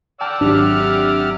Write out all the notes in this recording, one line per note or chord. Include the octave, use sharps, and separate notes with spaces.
D5 F#5 G5 A5 E6 F6
G#1 C3 F#3 D4 G4 F6